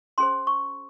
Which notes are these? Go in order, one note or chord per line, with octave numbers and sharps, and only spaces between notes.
C#4 G#4 C5 C6
C#6